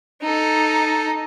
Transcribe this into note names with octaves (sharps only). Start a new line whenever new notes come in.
D#4 A4